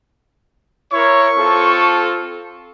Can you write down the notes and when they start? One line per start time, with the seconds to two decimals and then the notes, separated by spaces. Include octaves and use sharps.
0.92 E4 A#4 C#5 C#6
1.37 C4 F4 A4